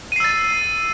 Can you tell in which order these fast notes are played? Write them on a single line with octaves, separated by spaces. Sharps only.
D#7 C7 E6 A6